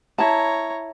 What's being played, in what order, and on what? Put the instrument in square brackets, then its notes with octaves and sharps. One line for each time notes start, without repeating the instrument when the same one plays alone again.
[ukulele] E4 A5 [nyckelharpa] C#5 A#5